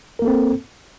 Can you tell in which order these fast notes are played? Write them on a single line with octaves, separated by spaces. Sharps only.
A#4 A#3 A4 C4